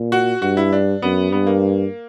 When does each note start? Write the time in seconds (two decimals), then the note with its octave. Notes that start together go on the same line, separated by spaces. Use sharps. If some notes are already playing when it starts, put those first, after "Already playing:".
Already playing: A#2
0.12 F#4
0.42 G2 F#4
0.57 E4
0.72 D4
1.02 F#2 B3
1.32 G2 B3
1.47 A#3